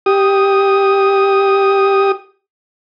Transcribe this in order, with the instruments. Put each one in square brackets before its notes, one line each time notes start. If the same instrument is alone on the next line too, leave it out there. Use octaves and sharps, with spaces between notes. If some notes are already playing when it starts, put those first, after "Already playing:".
[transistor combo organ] G4 D#6